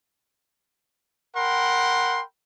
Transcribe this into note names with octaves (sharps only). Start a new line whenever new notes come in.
A#4 F#5 G5 B5 C6